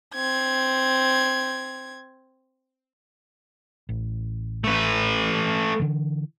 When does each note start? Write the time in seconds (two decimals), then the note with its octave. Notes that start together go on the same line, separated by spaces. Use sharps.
0.15 C4 G#6
3.89 A1
4.64 A3 B4
5.80 D3 E3